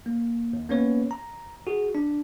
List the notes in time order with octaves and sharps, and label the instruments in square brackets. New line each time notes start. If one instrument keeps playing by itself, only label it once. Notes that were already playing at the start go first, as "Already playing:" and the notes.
[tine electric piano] A#3
D#2
A#3 B3 C#4 B4 C#5
A#5
F#4 G#4
D4